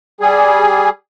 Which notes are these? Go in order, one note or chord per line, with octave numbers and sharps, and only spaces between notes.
G3 G#4